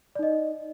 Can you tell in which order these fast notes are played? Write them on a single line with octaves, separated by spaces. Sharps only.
D5 D#4 D#5